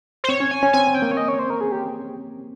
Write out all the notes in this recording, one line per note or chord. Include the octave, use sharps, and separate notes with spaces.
C5
C4 C#5
C#4
G#5
C#4
C4 G#5
C4
G5
A#3
C#5
D#5
C#5
C5
A#4
G#4
G4